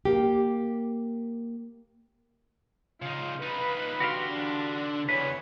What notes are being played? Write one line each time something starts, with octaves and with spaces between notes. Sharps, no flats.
A#3 G4
C#3 D#4 F4
D#4 F4 B4 B5
D3 F#4 G4 F5 C6
D4
E2 C#3 B4 C#5